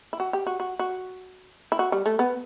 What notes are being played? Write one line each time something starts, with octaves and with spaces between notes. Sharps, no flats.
E4
F#4
G4
F#4
F#4
F#4
E4
F#4
G3
A3
B3